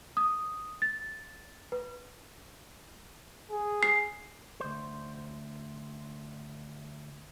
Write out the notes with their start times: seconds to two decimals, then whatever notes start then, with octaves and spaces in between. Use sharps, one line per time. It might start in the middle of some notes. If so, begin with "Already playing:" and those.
0.17 D#6
0.82 A6
1.72 B4
3.51 G#4
3.83 C7
4.60 D2 C5